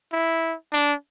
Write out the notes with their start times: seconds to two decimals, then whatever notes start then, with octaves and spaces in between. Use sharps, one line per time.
0.12 E4
0.72 D4